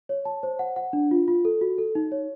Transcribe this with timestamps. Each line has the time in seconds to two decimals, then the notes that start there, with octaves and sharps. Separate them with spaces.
0.09 C#5
0.25 A5
0.43 C5
0.59 F#5
0.76 F#5
0.93 D4
1.11 F4
1.28 F4
1.45 A4
1.61 F#4
1.78 A4
1.95 D#4
2.12 C#5